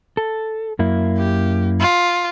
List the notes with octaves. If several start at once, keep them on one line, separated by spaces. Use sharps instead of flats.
A4
F#2 A#3 E4
G4
F4